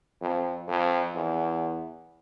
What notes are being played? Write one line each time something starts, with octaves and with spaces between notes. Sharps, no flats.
F2
F2
E2